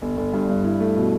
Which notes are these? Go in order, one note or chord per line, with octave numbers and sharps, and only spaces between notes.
G1
G1
G2
G2
E4
A3
B2